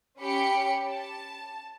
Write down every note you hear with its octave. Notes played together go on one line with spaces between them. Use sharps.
C#4 G4 B5 C#7
A5